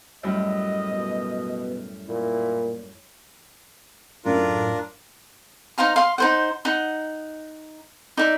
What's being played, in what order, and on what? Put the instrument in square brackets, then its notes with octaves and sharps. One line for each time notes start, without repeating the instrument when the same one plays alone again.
[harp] F#2 A2 G3 [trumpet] D#5
[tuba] B2
[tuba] A#2 [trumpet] E4
[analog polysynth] F#2 A2 [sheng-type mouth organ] D4 F4 A#4
[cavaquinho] D#4 C5 F5 A#5
F5 C6
D#4 C5 F#5
D#4 F#5
D#4 D5 E5